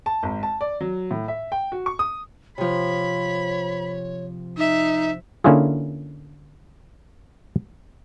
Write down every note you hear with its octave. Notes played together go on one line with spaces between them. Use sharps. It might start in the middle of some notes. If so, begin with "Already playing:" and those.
A5
G#1
A5
D5
F#3
A2
E5
G5
F#4
C#6
D#6
C3 F3 C#5 B5
D#4 E5
D3 A#3 C#4 E4 F4 G#4